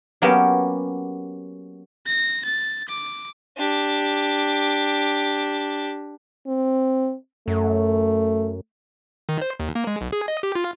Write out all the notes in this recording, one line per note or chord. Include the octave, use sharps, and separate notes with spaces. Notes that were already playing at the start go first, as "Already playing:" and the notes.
F#3 A#3 B3 C#4 G4 A#4
A#6
A6
D6
D4 G4
C4
F#2 A3
D#3
C5
D#2
A#3
G#3
B1
G#4
D#5
G4
F4